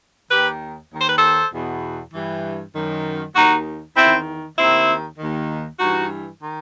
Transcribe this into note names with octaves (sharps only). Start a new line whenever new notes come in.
D#2 D#3 G4 B4
D#2 D#3
C5
B4
A4 C5
E2 B2
G2 E3
F#2 D#3
D#2 D#3 D#4 F#4
E2 D#3 C4 E4
D#2 D#3 C4 E4
D#2 D#3
G2 E3 D#4 F#4
D#3